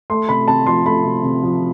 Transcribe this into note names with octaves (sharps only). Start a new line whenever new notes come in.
A3 C6
C3 B5
C3 A5
F3 C6
A3 B5
C3
C3
F3